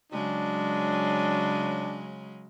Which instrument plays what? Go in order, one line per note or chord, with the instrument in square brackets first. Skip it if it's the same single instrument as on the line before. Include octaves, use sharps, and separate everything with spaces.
[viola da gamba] C#3 F#3 G#3 [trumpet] D4